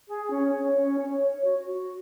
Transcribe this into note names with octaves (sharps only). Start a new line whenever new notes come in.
G#4
C#4
C#5
C#4
C#5
C#5
F#4
F#4